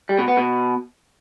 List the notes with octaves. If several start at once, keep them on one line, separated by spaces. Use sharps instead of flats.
G3
B2
B3
B2